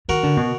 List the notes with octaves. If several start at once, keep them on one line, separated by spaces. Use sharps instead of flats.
D#3 F#4 A#4
D3
B2